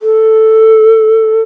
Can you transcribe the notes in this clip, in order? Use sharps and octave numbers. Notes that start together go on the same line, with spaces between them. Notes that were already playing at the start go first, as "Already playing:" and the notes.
A4